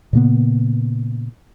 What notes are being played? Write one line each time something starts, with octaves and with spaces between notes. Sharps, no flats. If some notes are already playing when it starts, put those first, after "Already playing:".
A#2 C#3 A#3 B3